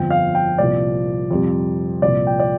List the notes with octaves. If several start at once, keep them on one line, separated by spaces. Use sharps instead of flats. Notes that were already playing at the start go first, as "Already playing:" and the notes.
Already playing: G1 F2 F3 G5
F5
G5
C2 A#2 F3 D5
F2 C3 G3
C2 A#2 F3 D5
G5
D5